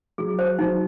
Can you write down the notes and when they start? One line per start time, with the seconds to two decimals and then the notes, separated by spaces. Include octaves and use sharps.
0.18 F#3 G#4
0.39 C5
0.59 F#3 D#4